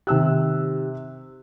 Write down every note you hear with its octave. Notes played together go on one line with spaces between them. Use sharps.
C3 D#3 G4 E6 F#6